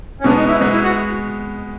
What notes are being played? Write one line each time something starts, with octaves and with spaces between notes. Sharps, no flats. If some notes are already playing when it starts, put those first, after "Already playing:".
C#4
B2 G#3 B3 D4
D#4
E4
B2 G#3 B3 D#4
E4
F#4